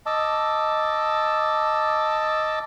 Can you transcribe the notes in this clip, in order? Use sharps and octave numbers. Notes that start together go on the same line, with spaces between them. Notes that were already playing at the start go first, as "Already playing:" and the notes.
D#5 A5 D6 E6